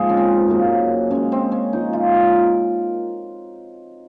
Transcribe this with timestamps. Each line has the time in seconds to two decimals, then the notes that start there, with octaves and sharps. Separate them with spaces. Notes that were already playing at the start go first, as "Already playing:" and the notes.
Already playing: G#2 F3 G#3 A#3 G#4
0.09 C#4
0.17 C4
0.48 F#2 C#3 F#3 A#3
1.11 C#3 G#3 C#4
1.32 C4
1.52 C#4
1.73 A#2 F3 G#3 D#4
1.93 F4
2.14 A#4